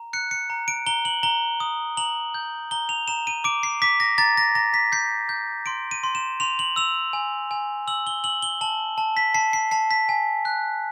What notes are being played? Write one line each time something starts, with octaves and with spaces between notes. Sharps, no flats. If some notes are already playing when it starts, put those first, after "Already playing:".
Already playing: A#5
F#6 C#7
C#7
A#5
D7
A#5 G7
F#7
A#5 G7
D#6
A#5 F#7
G6
A#5 G7
F7
A#5 E7
D#7
D6 D7
C7
D6 B6
A#6
A#5 A6
A#6
A#5 A#6
B6
G6 C7
G6
C6 D7
D#7
C6
E7
C6 F7
F#7
E6 F7
G#5
G#5
E6 F#7
G7
E6 F#7
G7
A5 F#7
A5
B6
A5 C7
C7
A5 C7
B6
G#5
F#6